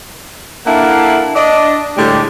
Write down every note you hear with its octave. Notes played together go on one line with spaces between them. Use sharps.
A#3 D4 E4 A4 F5 F#5
D4 D#5
A2 D3 G3 G#3 G4